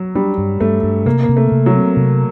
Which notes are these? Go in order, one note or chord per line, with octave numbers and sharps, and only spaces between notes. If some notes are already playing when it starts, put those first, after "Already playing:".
Already playing: F#3
G3 D4
G2
G2 A3
G2
C3 A#3
A#3
C3
A3
C3
F#3
C4
C3